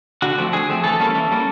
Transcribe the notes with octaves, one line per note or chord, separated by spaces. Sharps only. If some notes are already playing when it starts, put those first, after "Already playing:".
D3 F#4
F3 A3 C4
D3 G#4
F3 A3 C4
E3 A4
G3 A#3 C#4
E3
G3 A#3 C#4